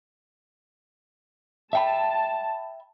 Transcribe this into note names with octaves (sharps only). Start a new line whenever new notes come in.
E5 G5 A5 B5